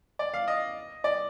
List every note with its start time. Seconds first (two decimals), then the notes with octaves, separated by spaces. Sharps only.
0.19 D5
0.34 F5
0.48 D#5
1.04 D5